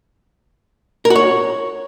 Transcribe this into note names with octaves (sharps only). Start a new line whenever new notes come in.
A#4
F#4
C#5